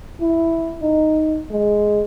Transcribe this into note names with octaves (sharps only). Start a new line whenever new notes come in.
E4
D#4
G#3